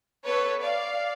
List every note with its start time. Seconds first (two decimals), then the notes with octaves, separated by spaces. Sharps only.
0.23 B3 A4 B4 C#5
0.60 D5 F5